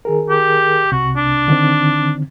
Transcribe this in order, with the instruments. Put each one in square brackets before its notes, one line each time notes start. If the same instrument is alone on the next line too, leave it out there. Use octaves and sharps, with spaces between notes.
[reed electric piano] D#3 G#4 A#4
[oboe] G4
[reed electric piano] C2 C3 [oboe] F#4
[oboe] D4
[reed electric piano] D3 D#3 C4